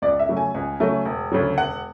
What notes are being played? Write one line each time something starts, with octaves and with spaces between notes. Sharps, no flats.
C#2 D5
E5
C#3 F#3 A3
G#5
C#2
C#3 F#3 A3
E1
D2 C#3 F#3
E1 F#5